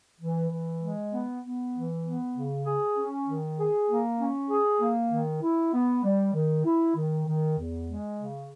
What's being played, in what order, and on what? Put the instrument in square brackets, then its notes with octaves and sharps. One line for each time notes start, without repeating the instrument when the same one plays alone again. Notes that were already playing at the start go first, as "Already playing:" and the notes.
[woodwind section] E3
E3
G#3
B3
B3
E3
B3
C#3
G#4
C#4
D#3
G#4
A#3
C#4
G#4
A#3
D#3
E4
B3
G3
D#3
E4
D#3
D#3
E2
G#3
C#3